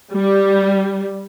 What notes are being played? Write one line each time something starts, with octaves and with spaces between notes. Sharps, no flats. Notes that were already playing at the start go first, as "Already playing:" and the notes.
G3